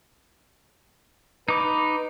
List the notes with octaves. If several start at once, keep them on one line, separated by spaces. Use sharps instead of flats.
D#4 B4 D6